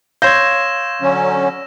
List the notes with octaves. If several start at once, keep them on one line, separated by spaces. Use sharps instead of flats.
C#5 F5 C6 E6 G6 G#6 A#6 E7
D3 F#3 C#4